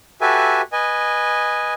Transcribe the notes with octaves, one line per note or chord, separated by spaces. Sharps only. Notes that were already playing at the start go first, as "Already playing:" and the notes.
F#4 G4 A4 B4 E5 G#5
B4 D#5 G#5